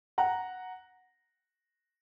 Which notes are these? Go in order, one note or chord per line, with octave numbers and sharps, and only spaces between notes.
F#5 A#5